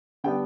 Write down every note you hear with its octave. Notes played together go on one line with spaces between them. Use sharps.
D3 G3 B3 D4 G5